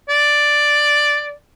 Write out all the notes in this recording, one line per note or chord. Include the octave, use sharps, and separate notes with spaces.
D5